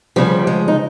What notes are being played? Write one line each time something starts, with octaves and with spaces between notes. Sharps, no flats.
D2 C#3 F3 G3
G#3
D#4